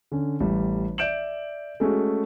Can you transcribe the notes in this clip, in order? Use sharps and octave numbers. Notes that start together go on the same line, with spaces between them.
D3 C#4
A1 G3
D5 E5 G6 D7 E7 F#7
G#3 A3 C#4 F#4